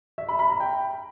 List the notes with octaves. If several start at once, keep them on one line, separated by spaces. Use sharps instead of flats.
E5
B5
B5
A#5
G5